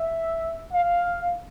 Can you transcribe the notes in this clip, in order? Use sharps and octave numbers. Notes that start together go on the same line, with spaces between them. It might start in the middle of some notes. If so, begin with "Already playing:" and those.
Already playing: E5
F5